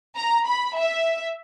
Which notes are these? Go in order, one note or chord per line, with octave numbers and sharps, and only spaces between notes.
A#5
B5
E5